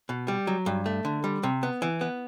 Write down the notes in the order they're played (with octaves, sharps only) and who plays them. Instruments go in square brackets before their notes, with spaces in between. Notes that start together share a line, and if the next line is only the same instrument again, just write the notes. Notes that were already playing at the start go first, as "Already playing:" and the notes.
[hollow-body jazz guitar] B2
G3
F#3
G2
A3
D3
G3
C3
B3
E3
B3